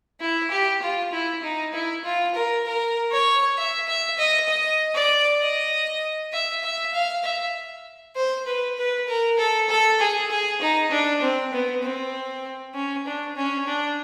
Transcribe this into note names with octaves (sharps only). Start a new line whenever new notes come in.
E4
G4
F4
E4
D#4
E4
F4
A#4
A#4
C#5
E5
E5
D#5
D#5
D5
D#5
E5
E5
F5
E5
C5
B4
B4
A#4
A4
A4
G#4
G#4
D#4
D4
C4
B3
C4
C#4
D4
C#4
D4